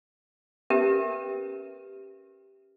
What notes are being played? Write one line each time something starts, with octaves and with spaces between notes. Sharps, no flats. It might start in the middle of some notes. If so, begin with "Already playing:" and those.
C#4 G4 A#4 B4 E5